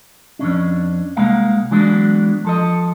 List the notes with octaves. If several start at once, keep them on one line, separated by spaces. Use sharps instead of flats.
F2 A#2 C#4 D4
C2 G#3 A#3 F5 F#5
E3 F#3 G#3 B3 D4
F3 A4 D#5